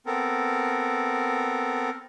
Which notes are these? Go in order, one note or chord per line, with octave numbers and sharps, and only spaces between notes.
B3 C4 A4 A#4